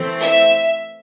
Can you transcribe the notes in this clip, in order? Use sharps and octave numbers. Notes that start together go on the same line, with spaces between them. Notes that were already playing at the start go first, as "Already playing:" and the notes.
Already playing: E3 A3 C4
E5